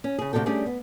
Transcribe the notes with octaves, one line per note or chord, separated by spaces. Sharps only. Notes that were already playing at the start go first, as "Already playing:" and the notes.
C#4
C#3 G#4
D2 C3 D#3 F#4 A4 G5
G3 A3 C#4 D4 G4 G#4
B3